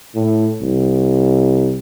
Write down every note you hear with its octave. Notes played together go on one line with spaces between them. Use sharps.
A2
C2